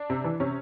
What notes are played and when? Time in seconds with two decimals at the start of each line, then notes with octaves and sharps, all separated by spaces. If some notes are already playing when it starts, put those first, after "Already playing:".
Already playing: D4
0.10 C3
0.24 E3
0.40 C3 C#4